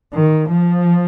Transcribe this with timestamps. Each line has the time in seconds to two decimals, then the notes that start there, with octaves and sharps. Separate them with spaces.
0.14 D#3
0.50 F3